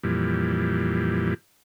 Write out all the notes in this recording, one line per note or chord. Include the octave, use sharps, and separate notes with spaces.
F2 A#2 E3 G3